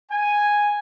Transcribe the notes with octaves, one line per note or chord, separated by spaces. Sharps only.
G#5